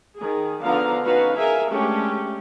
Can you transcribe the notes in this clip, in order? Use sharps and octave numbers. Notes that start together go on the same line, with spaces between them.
D#3 G#4
D3 F3 B3 F5 A#5
C#4 D#4 F#4 B4 F5
G#4 A#4 E5 F5 G#5
G#3 A3 C#4 D4 G4